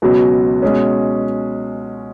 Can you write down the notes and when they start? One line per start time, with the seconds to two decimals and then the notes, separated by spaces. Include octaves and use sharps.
0.02 C#2 B2 F#3
0.62 B2 G#3 C#4